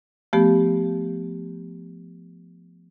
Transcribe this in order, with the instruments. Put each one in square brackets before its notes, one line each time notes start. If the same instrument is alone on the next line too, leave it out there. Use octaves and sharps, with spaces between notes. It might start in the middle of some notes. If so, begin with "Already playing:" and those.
[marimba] F3 A3 B3 G4